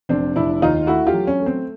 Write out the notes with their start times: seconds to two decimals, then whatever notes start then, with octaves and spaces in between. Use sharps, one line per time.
0.09 F1 C4 D4
0.36 F1 D4 E4
0.61 D#2 D#4 F4
0.87 A3 E4 F#4
1.07 F4 G4
1.13 F#3
1.27 C#4
1.40 A3
1.46 C4